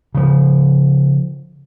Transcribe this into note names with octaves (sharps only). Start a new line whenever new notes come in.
C#3 F3